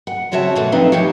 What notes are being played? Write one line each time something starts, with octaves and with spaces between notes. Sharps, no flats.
F#5
C#3 C4 F#4 C#5 E5 A5
B2 E3 A3 F#4
F3 C4 D#4 B4 E5 F5
E3 F3 D#4 G4 C#5